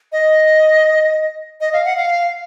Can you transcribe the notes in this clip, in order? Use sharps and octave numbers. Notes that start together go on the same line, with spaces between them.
D#5
D#5
F5
F#5
F5